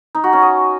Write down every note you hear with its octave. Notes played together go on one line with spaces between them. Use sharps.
D#4
F#4
C#4
D#5